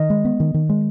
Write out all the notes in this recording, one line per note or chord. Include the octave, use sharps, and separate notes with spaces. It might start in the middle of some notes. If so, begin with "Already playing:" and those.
Already playing: D#3 D#5
G#3
B3
D#3
D#3
G#3